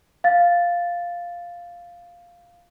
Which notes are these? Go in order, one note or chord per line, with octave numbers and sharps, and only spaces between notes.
F5 A6